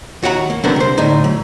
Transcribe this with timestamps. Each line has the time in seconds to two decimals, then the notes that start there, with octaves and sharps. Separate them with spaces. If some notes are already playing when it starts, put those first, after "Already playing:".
0.23 D#2 F#4 C#5 F#5 A#5
0.50 A#3
0.64 D3 F#3 B3 C4 D4 A#4
0.76 C2 C5
0.98 A2 D3 D#4
1.24 F#3